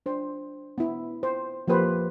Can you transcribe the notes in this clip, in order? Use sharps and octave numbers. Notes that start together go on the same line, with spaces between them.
D4 C5
B3 E4
C5
F3 A#3 G4 B4 C5